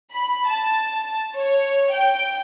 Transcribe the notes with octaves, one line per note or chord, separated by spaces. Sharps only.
B5
A5
C#5
G5